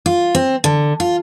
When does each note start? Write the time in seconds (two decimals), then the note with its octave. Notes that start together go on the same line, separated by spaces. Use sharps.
0.06 F4
0.35 C4
0.64 D3
1.00 F4